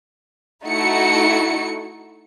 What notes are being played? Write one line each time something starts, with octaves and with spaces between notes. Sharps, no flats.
A3 D#4 E4 F#4 A4 C#7